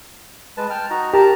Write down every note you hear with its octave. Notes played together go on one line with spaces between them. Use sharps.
G#3 B4 A5
G5 A5 F6
D#4 F#4 A#5
G4 A#4 A5 A#5